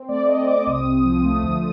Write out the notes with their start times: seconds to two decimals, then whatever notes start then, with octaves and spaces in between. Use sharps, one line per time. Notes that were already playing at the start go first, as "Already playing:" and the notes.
Already playing: C4
0.09 A3 D5
0.28 C4 D#5
0.47 C4 D6
0.67 C2 D#6
0.86 C2
1.05 F3
1.24 A3
1.43 D2